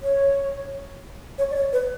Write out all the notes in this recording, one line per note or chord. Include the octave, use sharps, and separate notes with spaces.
C#5
C#5
D5
C#5
B4